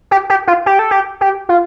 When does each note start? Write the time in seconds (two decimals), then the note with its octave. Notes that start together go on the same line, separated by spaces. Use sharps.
0.11 G4
0.30 G4
0.47 F4
0.66 G4
0.79 A4
0.91 G4
1.21 G4
1.49 F4